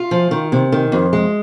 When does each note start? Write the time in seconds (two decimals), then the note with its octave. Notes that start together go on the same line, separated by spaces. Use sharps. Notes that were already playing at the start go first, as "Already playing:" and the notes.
Already playing: F4
0.11 F3
0.31 D#3
0.52 C3
0.72 D#3
0.92 F2
1.13 G#3